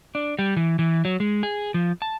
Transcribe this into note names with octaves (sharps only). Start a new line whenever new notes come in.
D4
G3
E3
E3
F#3
G#3
G#4
F3
A5